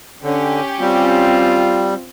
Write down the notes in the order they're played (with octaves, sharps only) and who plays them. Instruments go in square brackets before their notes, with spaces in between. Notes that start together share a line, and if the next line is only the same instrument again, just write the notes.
[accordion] D3 [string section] C#4 G4
[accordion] G3 [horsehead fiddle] C4 [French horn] F4